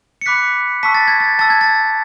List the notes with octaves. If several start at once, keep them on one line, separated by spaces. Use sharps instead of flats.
C#7
B5 D6 F#6 B6
A5 C#6 E6 B6
A6
G#6
A6
A5 E6 A6
G#6
A6